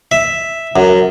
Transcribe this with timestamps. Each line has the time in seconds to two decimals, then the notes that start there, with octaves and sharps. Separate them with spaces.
0.12 E5
0.76 F#2